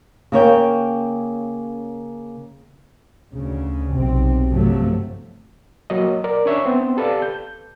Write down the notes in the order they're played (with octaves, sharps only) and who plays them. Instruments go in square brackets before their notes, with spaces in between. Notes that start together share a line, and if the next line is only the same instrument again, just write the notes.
[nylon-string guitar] C#3 A#3 C#5 G5
[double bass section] D2 C#3
B1 C3 C4
G1 C3 F3 F#3 A3
[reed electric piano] F#3 A#3 D#5
A#4 D5
C#4 D4 C#5 E5
B3 C4 C5
G4 A4 B4 D5 F5 A5
G6